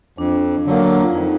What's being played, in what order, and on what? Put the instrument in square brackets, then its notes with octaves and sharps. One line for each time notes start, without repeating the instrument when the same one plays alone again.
[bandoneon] F2 [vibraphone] D4
[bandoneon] D3 F#3 A#3
[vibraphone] F4
[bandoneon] F2 [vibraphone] D#4